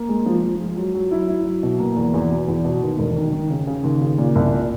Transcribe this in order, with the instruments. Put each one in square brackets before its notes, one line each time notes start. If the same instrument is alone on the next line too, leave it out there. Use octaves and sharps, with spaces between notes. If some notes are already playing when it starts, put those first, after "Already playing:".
Already playing: [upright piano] A#3
G#3
F3
F3
G#3
F#3
F#3
E4
E4
F#3
B2
A#3
E2
E2
B2
E2
B2
D#2
E1
D#3
D#3
C#3
C#3
D#2
C#3
A#2
C2
A#2